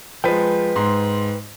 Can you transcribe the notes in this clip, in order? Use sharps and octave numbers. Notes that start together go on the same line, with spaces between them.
F3 G#3 B4 G5
G#2 C6